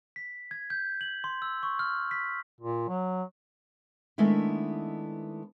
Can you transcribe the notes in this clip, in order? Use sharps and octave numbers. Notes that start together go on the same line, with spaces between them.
B6
G#6
G6
F#7
C6
E6
C#6
F6
B6
A#2
F#3
D#3 G#3 A3 B3 D4 E4